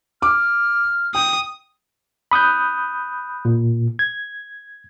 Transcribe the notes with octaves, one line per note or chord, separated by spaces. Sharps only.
D6 F6
G5 D#6
B5 D#6 F#6 G6
A#2
G#6